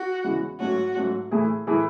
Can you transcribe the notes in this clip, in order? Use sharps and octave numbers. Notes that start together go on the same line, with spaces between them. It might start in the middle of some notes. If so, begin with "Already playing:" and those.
Already playing: F#4
E2 C#3 E3 G#3
G#2 F#3 A3 C#4 F#4
G#2 F#3 A3 C#4
A2 E3 A3 E4 G#4
A2 E3 A3 E4 G#4